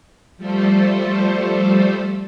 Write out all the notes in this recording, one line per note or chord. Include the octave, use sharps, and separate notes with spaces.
F3 G3 A3 A4 C5